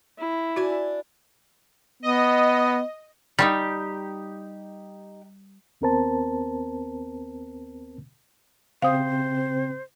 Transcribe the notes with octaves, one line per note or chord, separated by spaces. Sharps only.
E4
D4 F#4 G#5
B3 D#5
G3 D#4 F4 G4
D#2 B3 C4 A#4 C5 A5
C#3 C4 C5 F5 D#6